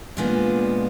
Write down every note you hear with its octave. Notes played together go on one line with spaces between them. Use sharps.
A#2 F3 G#3 B3 D4